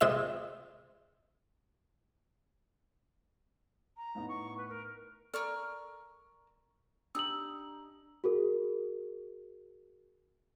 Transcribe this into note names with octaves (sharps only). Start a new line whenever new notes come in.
C3 G#3 F4 E5 E7
A#5
A2 B3 D#4
C#6
B4
A#4
A4 A#4 D5 C#6 F6
D4 D#4 G4 E6 F#7
F#4 G#4 A#4